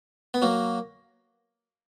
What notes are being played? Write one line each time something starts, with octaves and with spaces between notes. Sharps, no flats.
B3
F#3 A#3